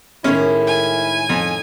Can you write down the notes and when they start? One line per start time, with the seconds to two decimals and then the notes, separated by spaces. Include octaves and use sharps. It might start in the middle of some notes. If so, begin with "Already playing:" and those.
0.24 A2 D#3 G#3 C#4 E4
0.67 G#5
1.29 F2